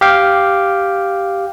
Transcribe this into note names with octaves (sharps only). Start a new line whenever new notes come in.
G4 F5 G5